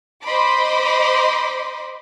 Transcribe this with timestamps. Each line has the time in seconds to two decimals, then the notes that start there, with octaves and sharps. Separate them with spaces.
0.25 C5 D#5 B5 C6 D6